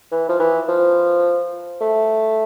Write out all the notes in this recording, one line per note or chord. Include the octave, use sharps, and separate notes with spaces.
E3
F3
E3
F3
A3